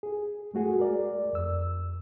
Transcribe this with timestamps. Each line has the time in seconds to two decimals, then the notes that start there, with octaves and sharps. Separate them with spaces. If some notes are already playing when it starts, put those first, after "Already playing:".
0.03 G#4
0.54 G#3 A3 F#4 G#4
0.79 A#4 D5
1.33 F2 E6